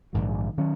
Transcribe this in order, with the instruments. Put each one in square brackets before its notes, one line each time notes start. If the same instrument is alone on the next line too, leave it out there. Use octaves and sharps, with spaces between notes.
[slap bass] A#1 G#2 D#3 F#3
D#3 F#3 C#4